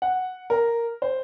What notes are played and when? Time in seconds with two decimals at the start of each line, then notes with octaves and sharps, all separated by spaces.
0.02 F#5
0.50 A#4
1.02 C5